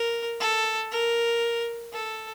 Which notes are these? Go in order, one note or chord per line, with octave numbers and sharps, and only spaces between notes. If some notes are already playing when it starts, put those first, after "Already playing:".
Already playing: A#4
A4
A#4
A4